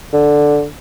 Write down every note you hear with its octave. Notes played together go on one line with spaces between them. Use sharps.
D3